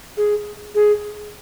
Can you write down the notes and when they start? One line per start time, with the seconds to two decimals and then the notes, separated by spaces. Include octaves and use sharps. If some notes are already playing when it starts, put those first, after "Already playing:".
0.17 G#4
0.75 G#4